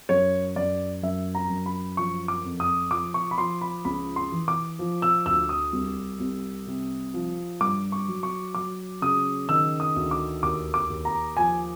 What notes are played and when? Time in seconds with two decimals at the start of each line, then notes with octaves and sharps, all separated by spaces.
0.09 F#2 C#5
0.56 F#2 D5
1.03 F#2 E5
1.35 A#5
1.50 F#2
1.66 B5
1.97 F3 C#6
2.28 D6
2.44 F2
2.60 D#6
2.91 F3 D6
3.14 C#6
3.31 B5
3.38 F3 C6
3.61 B5
3.85 C#2 B5
4.16 C6
4.32 E3
4.48 D6
4.79 F3
5.02 E6
5.26 D2 E6
5.49 D#6
5.73 C2
6.20 C2
6.67 C3
7.14 F3
7.61 G2 D6
7.92 C#6
8.08 F#3
8.23 C#6
8.55 F#3 D6
9.02 C#3 D#6
9.49 D#3 E6
9.80 D#6
9.96 D2
10.11 D6
10.43 D#2 D6
10.74 D6
10.90 D#2
11.05 A#5
11.37 F3 G#5